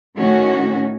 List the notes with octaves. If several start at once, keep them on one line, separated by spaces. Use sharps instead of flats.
A2 D#3 A3 C#4 F#4